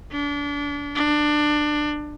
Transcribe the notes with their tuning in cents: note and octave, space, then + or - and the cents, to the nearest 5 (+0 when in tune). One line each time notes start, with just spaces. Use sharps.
D4 -30
D4 +20